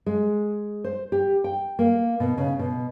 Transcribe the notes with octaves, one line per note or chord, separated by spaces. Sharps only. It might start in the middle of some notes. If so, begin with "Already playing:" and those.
G#3
C5
G4
G5
A#3
B2
C#3
B2